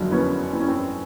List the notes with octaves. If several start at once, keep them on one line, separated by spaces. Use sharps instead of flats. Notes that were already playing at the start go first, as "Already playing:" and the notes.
Already playing: F#1 F2 D3 F#3
B3 C#4
C4
C#4
C4